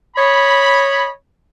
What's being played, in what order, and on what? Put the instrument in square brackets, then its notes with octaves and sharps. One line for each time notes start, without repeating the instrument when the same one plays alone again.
[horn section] C#5 D#5 B5